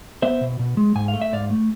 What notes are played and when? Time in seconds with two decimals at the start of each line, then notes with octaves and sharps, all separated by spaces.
0.22 B3 C5 E5
0.41 B2
0.59 B2
0.77 G#3
0.95 G#2 G#5
1.08 F5
1.14 A3
1.21 E5
1.33 G#2 D5 F5
1.50 A3